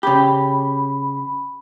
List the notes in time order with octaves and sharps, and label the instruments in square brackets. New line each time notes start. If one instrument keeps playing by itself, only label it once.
[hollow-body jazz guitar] C#3 G4 [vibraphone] B5